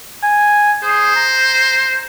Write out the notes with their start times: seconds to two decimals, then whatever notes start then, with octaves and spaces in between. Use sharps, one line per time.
0.23 G#5
0.83 G#4 C5
1.16 A#5